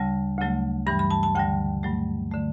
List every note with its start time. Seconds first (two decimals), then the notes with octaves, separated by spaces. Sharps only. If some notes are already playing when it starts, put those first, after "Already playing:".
Already playing: D2 C#3 G3 A5
0.38 D2 C#3 F#3 A3
0.87 G2 E3 G3 B5
0.99 B5
1.11 A5
1.23 A5
1.35 D2 D3 G3 G5
1.83 G2 F#3 A3
2.32 D3 A3